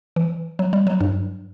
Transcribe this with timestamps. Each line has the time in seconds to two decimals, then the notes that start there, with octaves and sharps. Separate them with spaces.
0.16 E3
0.59 F#3
0.73 G3
0.87 F#3
1.00 G2